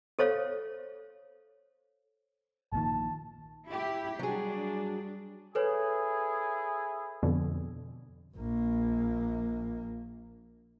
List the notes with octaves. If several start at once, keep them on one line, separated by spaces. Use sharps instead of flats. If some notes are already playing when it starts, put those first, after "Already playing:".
A4 C5 C#5 F5
A#1 A#2 D#3 A5
E4 G4
F#3 G3 D4 G#4
E4 G#4 A4 B4 C#5
F2 B2 D3
A#1 A#3